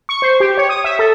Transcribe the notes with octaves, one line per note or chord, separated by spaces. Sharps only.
C#6
C5
G4
C#5
D#6
E5
A4